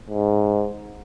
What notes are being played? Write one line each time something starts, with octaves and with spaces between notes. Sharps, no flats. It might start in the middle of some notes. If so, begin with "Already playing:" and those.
G#2